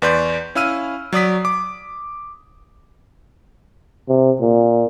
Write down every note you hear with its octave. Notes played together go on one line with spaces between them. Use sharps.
E2 B4 D5 C6 G6
C#4 E4 F5 E6 F6 D#7
F#3 D5 D#6 B6
D6
C3
A#2